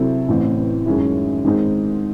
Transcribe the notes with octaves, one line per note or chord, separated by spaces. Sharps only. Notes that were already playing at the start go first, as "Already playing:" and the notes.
Already playing: C3 F#3 C4 E4 A4
A1 A2 E3 C4
F#2 D#3 G#3 C#4 E4
G#2 D#3 G#3 C4 D#4